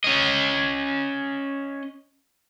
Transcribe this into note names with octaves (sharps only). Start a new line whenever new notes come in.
C#4 D#5